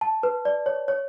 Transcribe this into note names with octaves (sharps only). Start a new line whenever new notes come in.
A5
B4
D5
C#5
C#5